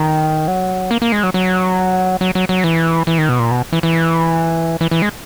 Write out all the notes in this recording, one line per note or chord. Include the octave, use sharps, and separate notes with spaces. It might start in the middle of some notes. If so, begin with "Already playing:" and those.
Already playing: D#3
F#3
A#3
A#3
G#3
F#3
F#3
F#3
F#3
F#3
E3
E3
D#3
B2
A#2
B2
E3
E3
E3
E3
G#3